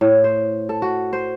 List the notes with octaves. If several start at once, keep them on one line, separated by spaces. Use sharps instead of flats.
A2
C5
A4
F#4
C5